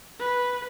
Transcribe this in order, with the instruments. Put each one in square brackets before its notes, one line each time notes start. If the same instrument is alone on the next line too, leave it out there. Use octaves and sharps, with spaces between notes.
[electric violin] B4